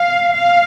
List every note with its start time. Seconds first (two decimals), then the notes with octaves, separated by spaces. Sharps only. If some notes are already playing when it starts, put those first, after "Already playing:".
Already playing: F5
0.35 F5